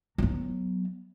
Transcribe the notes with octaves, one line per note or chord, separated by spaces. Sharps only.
F#3 B3